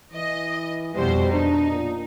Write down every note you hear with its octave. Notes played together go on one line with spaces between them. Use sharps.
E3 D#5
F2 B2 G3 C5
D4 D#4
A#2